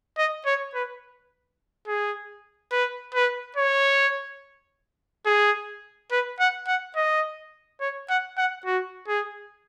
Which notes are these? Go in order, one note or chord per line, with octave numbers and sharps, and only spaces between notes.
D#5
C#5
B4
G#4
B4
B4
C#5
G#4
B4
F#5
F#5
D#5
C#5
F#5
F#5
F#4
G#4